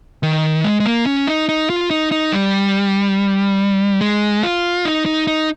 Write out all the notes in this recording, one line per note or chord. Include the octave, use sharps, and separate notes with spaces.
D#3
G#3
G#3
A#3
C#4
D#4
D#4
F4
D#4
D#4
G3
G#3
F4
D#4
D#4
D#4